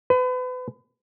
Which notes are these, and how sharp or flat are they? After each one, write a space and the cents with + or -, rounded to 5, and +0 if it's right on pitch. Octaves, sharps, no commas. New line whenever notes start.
B4 +35